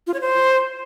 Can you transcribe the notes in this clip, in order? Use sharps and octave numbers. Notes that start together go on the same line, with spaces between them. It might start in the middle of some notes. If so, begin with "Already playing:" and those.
F4
C#5
C5